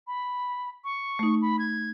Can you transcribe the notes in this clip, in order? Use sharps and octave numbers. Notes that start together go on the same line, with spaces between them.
B5
C#6
A3 D#4
B5
G#6